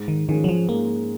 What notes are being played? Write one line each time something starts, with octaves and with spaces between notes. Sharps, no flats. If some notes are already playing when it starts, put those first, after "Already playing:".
Already playing: G#2
D#3
D#3 F3 G#3 C#4
F#3
F3
G#2 A#3